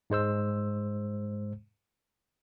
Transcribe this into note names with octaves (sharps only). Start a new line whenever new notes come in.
G#2 G#3 C5 E6